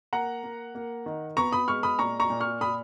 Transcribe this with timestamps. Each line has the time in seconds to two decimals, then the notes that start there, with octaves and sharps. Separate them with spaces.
0.13 A#3 F#5 A#5
0.44 A#3
0.75 A#3
1.06 D#3
1.37 B3 A#5 C#6
1.52 B5 D#6
1.68 G#3 C#6 F6
1.83 B5 D#6
1.99 A#2 A#5 C#6
2.20 A#5 C#6
2.30 A#2
2.40 C#6 F6
2.61 A#2 B5 D#6